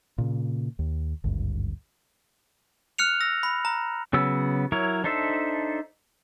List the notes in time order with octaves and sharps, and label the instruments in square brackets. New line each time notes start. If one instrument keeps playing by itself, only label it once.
[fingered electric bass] A#2 C#3
D#2
G#1 D2 G2
[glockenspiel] F6 F#6 C#7 F7
E6 A#6
B5
A#5
[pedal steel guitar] C#3 F#3 B3 E6
F#3 E4 A#4 C#5
D4 D#4 A4 C5 E5